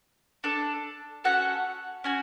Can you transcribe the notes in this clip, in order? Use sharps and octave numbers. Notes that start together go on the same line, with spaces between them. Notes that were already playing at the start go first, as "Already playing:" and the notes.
D4 A4
C#4 F#4 A4 F#5
C#4 F#4 G#5